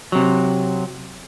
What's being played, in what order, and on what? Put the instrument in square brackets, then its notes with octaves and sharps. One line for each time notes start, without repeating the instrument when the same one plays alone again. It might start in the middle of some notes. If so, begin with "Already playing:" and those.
[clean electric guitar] C3 F#3